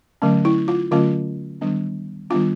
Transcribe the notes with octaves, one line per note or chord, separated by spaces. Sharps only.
D3 F#3 A3 C#4
E4
F4
D3 F#3 A3 C#4 F4
D#3 G3 B3 D4
D#3 G3 B3 D4 F4